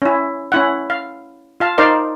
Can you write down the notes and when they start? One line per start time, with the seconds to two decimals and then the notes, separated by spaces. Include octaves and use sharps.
0.02 C#4 E4
0.52 C#4 E4 F#5
0.90 F5
1.60 F4 F5 A5
1.78 D#4 A#4 C5 D5 F5